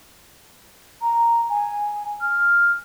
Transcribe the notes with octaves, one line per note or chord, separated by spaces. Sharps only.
A#5
G#5
F6